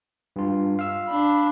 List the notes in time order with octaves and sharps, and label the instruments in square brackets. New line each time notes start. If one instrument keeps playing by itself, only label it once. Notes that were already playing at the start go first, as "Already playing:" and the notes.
[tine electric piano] G2 F4
F5 E6
[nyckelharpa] D4 B5